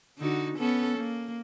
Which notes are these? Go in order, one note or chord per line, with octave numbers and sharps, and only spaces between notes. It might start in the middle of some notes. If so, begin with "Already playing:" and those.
D3 D#4 F#4
B3 C#4 A4
A#3